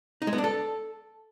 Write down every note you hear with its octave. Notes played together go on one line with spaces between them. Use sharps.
D#4
G#3
B3
D4
A4